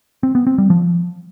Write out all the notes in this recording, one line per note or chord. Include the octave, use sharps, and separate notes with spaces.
C4
B3
C4
G3
F3